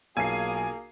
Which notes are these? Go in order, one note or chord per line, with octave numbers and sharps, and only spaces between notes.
B1 A#3 F4 G#4 G#5 C7